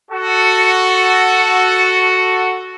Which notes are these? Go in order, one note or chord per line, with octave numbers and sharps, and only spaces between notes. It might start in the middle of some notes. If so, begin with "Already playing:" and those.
F#4 A4